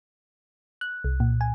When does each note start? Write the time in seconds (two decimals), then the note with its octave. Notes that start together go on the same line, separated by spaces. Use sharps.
0.81 F#6
1.04 C2
1.20 A#2
1.41 G#5